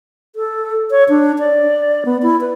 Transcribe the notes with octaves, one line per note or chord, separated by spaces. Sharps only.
A4
C#5
D4
D5
B3
E4
B4